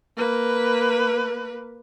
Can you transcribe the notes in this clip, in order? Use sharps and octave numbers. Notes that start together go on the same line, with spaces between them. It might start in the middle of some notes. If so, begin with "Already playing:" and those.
A#3 B4